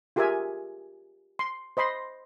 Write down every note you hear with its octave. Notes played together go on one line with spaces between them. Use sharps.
F4 G4 G#4 A#4 E5 G#5
C6
C5 D#5 B5 C6